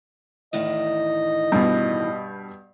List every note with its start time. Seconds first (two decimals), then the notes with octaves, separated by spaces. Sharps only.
0.53 E2 A2 D#3 D#5
1.52 G2 B2